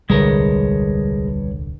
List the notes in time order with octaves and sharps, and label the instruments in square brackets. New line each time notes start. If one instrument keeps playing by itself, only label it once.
[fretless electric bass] D#1 C2 [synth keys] D3 [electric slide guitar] G3 B4 C#5 [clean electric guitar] G#3 A#4